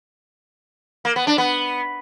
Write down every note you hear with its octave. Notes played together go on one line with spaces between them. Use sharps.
A#3
B3
D4
B3